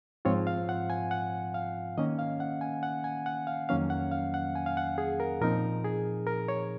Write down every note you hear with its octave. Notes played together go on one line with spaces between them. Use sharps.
G#2 F3 C4 F4 C#5
F5
F#5
G#5
F#5
F5
D#3 A#3 C#4 D#5
F5
F#5
G#5
F#5
G#5
F#5
F5
F2 D#3 F#3 A#3 C#4 F5
F#5
F5
F#5
G#5
F5
F#5
G#4
A#4
A#2 F3 C4 D#4 A#4
G#4
A#4
C#5